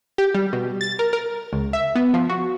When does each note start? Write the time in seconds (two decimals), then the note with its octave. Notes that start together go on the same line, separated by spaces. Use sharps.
0.18 G4
0.34 G3
0.53 B2
0.81 A6
0.99 A#4
1.13 A#4
1.53 C#2
1.73 E5
1.95 B3
2.14 F3
2.29 F#4